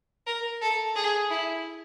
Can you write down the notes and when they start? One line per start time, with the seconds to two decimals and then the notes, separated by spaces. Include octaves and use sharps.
0.27 A#4
0.62 A4
0.96 G#4
1.30 E4